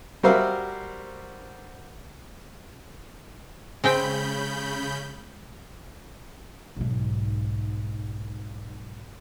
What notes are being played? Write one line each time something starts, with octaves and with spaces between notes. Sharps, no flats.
G3 F#4 A#4 C5 E5 F5
C#3 G#3 C4 G5 B5 G6
B1 G#2